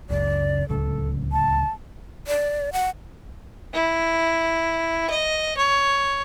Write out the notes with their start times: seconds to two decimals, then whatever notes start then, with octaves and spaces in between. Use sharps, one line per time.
0.10 F#1 C#2 C#3 D5
0.69 D1 C#2 A4
1.32 A5
2.27 D5
2.73 F#5
3.74 E4
5.10 D#5
5.57 C#5